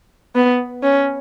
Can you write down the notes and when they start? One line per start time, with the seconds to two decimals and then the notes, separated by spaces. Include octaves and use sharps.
0.35 B3
0.83 C#4